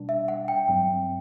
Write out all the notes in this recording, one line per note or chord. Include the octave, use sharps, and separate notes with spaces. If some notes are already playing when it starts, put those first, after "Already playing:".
Already playing: B2 G3 D4
E5
F#5
G5
G2 F#3 C4 G5